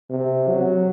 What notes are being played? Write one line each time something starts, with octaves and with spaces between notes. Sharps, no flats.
C3
F#3